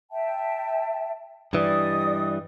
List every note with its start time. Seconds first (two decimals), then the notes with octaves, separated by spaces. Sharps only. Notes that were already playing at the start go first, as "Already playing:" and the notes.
0.11 E5 G5 A5
1.53 G2 E3 G3 D5 D#5 D#6